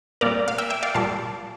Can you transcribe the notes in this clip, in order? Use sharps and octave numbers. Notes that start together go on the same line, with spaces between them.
A#2 G3 A#4 D5
F5
E5 G5
E5 G5
D5 F5
A#2 G3 F5 A5